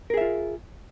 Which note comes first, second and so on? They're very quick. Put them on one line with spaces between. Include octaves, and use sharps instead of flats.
A#4 G#4 E5 F4